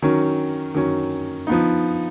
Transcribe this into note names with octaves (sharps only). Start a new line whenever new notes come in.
D#3 F#3 C#4
D#3 F#3 C#4
F3 B3 D#4